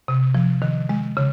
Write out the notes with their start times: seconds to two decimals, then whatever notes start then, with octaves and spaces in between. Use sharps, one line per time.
0.08 C3
0.35 F3
0.62 D#3
0.89 G#3
1.17 C#3